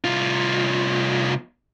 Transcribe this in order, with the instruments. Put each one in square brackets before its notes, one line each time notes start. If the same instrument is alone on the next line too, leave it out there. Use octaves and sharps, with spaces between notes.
[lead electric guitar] C2 F4